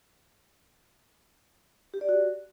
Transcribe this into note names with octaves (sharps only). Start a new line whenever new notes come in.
G4
D5
F#4